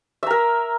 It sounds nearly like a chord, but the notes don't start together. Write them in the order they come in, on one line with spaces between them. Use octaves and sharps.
E5 A#5 A#4